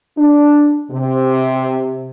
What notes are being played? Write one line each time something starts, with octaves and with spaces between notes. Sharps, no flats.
D4
C3